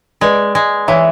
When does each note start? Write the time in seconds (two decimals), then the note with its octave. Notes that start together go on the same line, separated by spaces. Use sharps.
0.21 G#3 B4 D5
0.55 G#3
0.88 E3 C#5 E5